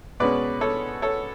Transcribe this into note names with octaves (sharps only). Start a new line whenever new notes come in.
B2 G#3 C#4 B4 D5
A4 C#5
A4 C#5